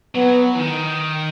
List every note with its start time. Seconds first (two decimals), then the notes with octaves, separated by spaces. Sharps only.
0.15 F#3 B3
0.55 E3
0.59 D#3